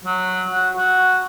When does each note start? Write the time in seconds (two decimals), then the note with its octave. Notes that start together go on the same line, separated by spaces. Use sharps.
0.04 F#3
0.50 F#4
0.77 F#4